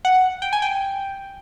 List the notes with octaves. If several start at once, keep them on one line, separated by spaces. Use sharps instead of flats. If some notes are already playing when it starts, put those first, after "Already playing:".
F#5
G5
G#5
G5